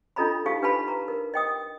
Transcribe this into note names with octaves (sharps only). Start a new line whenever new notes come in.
D4 F4 A4 D#5 A#5 B5
D#4 G4 F5 A5
D4 B4 F5 A5 B5
A#5
A#4
D#5 G5 D#6